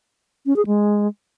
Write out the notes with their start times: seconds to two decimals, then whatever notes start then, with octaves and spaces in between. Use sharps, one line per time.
0.46 C#4
0.56 G#4
0.67 G#3